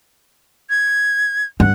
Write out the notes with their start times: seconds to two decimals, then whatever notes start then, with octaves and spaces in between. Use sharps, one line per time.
0.70 G#6
1.60 G2 F#5